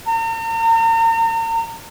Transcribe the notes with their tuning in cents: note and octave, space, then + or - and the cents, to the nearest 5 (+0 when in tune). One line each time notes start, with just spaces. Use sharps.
A#5 -40